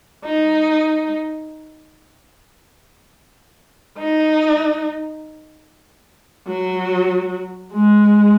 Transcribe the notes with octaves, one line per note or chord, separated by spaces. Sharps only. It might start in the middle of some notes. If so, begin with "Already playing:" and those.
D#4
D#4
F#3
G#3